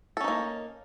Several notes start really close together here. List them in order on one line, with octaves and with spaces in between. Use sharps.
A4 C#4 D#4 A#3